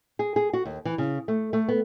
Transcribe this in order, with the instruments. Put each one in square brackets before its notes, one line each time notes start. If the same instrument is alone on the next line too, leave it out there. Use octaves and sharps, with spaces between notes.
[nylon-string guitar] G#4
G#4
F#4
D#2
E3
C#3
A3
A3
B3